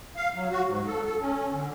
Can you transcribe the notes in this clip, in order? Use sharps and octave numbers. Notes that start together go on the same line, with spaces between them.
F5
F#3
F#4
G#2
A4
A4
C#4
D3